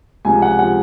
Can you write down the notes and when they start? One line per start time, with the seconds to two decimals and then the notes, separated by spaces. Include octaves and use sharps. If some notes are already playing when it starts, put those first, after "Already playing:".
0.25 C#2 C3 F3 G#5
0.42 F#5
0.59 C3 F3 F#5